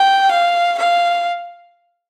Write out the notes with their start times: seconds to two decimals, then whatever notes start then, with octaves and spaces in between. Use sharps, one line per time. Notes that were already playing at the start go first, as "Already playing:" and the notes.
Already playing: G5
0.31 F5
0.78 F5